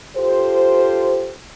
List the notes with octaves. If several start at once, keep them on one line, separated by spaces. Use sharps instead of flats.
F4 G4 A4 C5